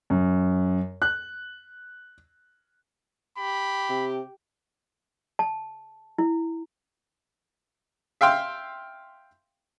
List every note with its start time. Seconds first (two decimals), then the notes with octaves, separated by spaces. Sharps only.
0.10 F#2
1.02 F#6
3.38 G4 B5
3.90 C3
5.39 A5
6.18 E4
8.21 E5 F5 G5 C6